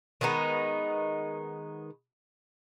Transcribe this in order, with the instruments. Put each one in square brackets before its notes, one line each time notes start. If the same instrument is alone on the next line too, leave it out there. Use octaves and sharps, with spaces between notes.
[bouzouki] D#3 G#3 B3 D#4